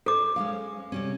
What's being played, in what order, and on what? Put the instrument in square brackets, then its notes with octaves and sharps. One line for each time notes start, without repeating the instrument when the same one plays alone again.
[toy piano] A4 D6 [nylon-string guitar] C5 D5
[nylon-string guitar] G#3 C#4 F5
C3 G3 C#4